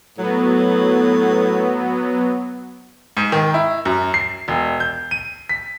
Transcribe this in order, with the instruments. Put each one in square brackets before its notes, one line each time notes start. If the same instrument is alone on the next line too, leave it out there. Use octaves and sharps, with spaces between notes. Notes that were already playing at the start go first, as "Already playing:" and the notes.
[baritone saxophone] A2 [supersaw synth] F#3 B3
[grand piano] G#2
D#3
E4
F#2
C7
E1
G6
D#7
B6